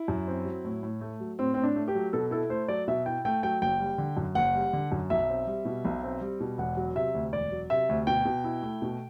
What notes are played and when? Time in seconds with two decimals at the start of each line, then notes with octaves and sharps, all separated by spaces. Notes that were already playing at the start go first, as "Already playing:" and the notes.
Already playing: E4
0.08 F#2
0.27 C4
0.45 F#3
0.65 A2
0.83 A2
1.01 A3
1.20 F#3
1.39 A2 C4
1.54 A2 C4
1.63 D4
1.76 A3
1.88 G4
1.95 F#3
2.13 B2 A4
2.31 E4 A4
2.50 A3 C5
2.68 F#3 D5
2.88 B2 E5
3.06 E4 G5
3.25 A3 G5
3.43 F#3 G5
3.62 F#1 G5
3.80 G3
3.98 D3
4.17 F#2
4.35 F#1 F#5
4.55 G3
4.73 D3
4.92 F#2
5.10 B1 E5
5.29 C4
5.47 G3
5.65 B2
5.85 B1
6.04 C4
6.21 G3
6.40 B2
6.58 E1 F#5
6.77 F#3
6.95 C3 E5
7.15 D2
7.33 E1 D5
7.52 F#3
7.70 C3 E5
7.89 D2
8.07 B2 G5
8.25 B2
8.44 E4
8.62 A3
8.82 B2